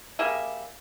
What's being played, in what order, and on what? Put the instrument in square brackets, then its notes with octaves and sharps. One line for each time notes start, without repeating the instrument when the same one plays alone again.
[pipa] G3 A#3 G#4 E5